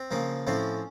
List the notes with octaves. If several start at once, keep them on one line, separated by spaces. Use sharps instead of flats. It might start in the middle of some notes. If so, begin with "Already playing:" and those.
Already playing: C4
C#3 F3 A#3
A2 F3 C4 C#4